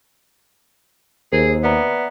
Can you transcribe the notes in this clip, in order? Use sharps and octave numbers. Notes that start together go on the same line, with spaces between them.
D#2 G#4 A#4 C5
B3 D5 E5 A#5